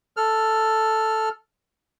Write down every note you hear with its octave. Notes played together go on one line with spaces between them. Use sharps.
A4 F6